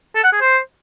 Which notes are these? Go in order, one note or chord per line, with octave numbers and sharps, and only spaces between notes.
A4
F#5
G#4
C5